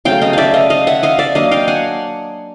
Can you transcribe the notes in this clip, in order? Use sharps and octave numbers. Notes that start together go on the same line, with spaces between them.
C#3 F#3 A3 F5 G5
D#5 F5
D5 E5 F5
D#5 F5
D#5 F5
E5 F#5
D#5 F5
D5 E5
F#3 A#3 D4 D#5 F5
F5 G5
F#5 G#5